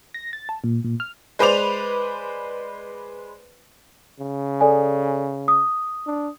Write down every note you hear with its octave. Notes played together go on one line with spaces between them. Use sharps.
A#6
A6
A5
A#2
A#2
F6
G#3 B4 C5 D5 F7
C#3
A4 D5 G#5
D#6
D4